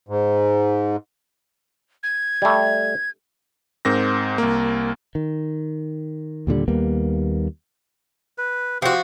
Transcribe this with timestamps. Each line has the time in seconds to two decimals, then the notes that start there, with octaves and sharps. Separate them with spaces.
0.09 G#2
2.03 G#6
2.42 G3 A3
3.85 G#2 C4 A#4 A#6
4.38 C2 A#3
5.15 D#3
6.47 D#2 A#2 D3 G3
6.68 D#2 G3 A#3 B3
8.38 B4
8.82 F3 C4 F#4 G4